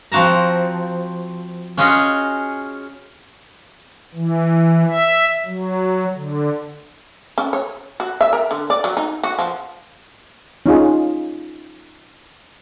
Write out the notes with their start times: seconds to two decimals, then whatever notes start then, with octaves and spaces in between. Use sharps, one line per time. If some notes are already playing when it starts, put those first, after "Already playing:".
0.12 F3 C4 F#4 A5 A#5
1.77 C#4 F4 F#4 G#4 C#5 D#5
4.14 E3
4.89 E5
5.46 F#3
6.14 D3
7.38 C#4
7.53 C#5
8.00 F#4
8.21 E5
8.33 A#4
8.51 D3
8.70 D5
8.84 F#3
8.97 D#4
9.23 F#4
9.39 F3
10.66 C#4 D#4 F4 G#4